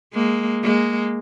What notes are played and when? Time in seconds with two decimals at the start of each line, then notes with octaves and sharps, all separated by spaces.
0.14 G#3 A#3
0.63 G#3 A#3